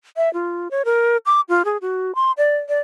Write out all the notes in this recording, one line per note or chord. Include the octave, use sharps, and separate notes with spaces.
E5
F4
C#5
A#4
D6
F4
G#4
F#4
C6
D5
D5